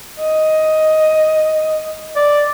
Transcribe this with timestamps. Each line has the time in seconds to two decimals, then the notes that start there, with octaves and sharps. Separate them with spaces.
0.20 D#5
2.16 D5